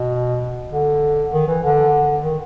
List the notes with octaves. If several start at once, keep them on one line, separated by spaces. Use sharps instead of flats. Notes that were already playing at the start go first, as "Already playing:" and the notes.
Already playing: B2
D3
D#3
E3
D3
D#3